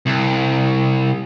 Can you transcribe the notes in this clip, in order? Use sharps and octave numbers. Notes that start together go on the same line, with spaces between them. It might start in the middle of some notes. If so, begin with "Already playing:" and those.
C2